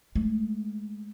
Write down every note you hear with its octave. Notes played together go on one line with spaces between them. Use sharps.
G#3 A3